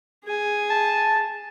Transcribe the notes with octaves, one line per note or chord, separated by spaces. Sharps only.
G#4 G#5
A5